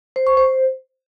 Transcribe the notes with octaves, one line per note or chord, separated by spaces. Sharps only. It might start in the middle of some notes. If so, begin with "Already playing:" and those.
C5
C#6
C5